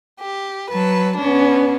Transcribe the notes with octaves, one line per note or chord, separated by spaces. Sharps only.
G4
F#3 B4 A5
B3 C#4 D4